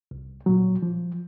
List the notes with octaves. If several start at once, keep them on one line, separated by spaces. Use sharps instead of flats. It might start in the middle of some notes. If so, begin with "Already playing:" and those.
C2
A#2 F#3
F3